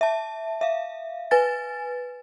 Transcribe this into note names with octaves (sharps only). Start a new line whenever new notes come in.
E5 A5
E5 F5
B4 G#5 A6